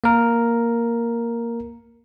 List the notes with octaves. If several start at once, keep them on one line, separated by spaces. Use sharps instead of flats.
A#3 A#4